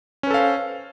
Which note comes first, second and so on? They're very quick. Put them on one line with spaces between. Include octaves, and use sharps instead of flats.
C#4 B4 A4 F5 C5